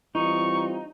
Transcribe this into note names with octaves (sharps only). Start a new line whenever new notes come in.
E3 G3 C4 D#4 F4 C#6